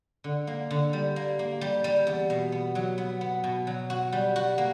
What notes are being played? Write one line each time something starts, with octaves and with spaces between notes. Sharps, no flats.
D3
A#3
D3
G3
A#3
A#3
G3
G3
E2
B2
B3
F#3
B3
B3
B2
F#3
F#4
G3
F#4
A#3